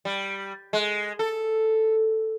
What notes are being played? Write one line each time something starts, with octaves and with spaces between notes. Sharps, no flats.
G3
G#3
A4